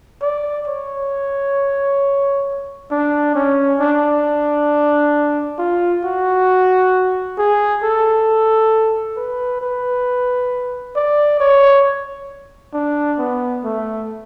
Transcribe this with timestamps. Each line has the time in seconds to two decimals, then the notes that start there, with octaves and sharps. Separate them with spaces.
0.22 D5
0.68 C#5
2.91 D4
3.35 C#4
3.80 D4
5.58 F4
6.04 F#4
7.38 G#4
7.83 A4
9.17 B4
9.61 B4
10.96 D5
11.40 C#5
12.74 D4
13.19 B3
13.64 A3